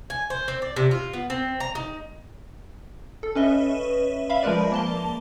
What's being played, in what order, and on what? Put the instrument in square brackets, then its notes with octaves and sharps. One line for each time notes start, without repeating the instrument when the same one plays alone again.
[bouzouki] G#5
C5
C4
D5
C3
F4
B3
C4
A#5
D#4
[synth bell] A4
C#4 B4 D#5 E5
E5 F5 B5
F3 G#3 A#4 B4 D5
A#3 A5 G7